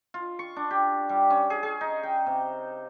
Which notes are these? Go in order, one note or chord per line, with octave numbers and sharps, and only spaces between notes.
F4
C#6
D4
G4
G3
C#4
G#4
G#4
D#4
G5
C3